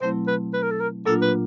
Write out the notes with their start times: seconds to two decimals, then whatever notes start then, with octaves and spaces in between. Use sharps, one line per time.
0.01 B2 F#3 A3 C4 E4 C5
0.27 B4
0.53 B4
0.63 A#4
0.71 A4
0.80 A#4
1.06 A#2 F#3 A#3 D4 F4 A4
1.22 B4